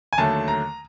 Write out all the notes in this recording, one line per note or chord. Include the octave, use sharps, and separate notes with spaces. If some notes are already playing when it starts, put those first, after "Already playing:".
G#5
D#2 D3 F#3 A3 A5
A#5